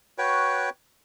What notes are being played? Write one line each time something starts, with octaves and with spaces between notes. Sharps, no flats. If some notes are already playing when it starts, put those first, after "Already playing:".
F#4 B4 C#5 G5